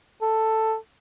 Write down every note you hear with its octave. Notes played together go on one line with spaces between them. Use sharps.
A4